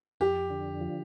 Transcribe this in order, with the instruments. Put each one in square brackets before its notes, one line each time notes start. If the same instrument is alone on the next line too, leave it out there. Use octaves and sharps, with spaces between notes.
[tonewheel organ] F2 [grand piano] G4
[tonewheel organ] D3
F3